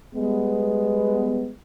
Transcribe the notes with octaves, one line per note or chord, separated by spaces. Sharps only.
G3 G#3 B3